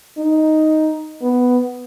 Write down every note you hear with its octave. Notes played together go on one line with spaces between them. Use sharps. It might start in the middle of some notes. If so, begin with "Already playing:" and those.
D#4
B3